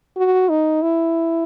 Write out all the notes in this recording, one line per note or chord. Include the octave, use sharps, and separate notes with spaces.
F#4
D#4
E4